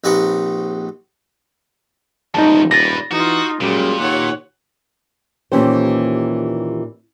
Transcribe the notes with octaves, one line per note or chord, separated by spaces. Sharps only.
A#1 C4 D#4 G4 B4 C#5
D#1 E2 G#2 D#4 A5
G3 B4 A6 A#6
E3 D#4 F4 F#4
F#2 A#2 G3 G#3
D#2 C#5 F#5
D#2 A#2 E3 C#4 G4 C5